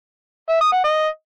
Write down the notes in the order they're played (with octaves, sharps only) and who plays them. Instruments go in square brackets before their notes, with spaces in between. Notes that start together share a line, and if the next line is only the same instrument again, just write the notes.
[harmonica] E5
D#6
F#5
D#5